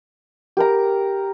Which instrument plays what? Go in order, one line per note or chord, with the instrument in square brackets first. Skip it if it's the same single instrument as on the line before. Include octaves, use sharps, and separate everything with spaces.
[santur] G4 A#4 A#5